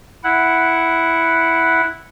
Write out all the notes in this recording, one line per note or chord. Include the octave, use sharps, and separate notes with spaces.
E4 F#5